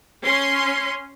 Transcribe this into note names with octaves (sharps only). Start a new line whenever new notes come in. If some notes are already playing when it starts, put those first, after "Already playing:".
C#4 C6